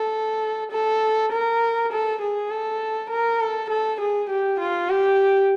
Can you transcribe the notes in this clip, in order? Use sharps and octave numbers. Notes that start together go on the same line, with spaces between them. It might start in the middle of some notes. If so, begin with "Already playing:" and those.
Already playing: A4
A4
A#4
A4
G#4
A4
A#4
A4
A4
G#4
G4
F4
G4